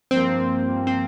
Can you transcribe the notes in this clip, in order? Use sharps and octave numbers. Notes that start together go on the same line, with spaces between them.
G2 F3 A#3 C4
C4